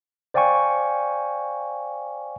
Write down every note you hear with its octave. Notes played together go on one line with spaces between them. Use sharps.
C5 D5 F5 G5 G#5 C#6